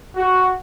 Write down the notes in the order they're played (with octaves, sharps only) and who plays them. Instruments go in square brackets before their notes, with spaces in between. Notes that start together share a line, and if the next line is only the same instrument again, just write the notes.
[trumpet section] F#4